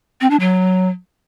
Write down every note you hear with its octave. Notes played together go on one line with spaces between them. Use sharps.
C4
D4
F#3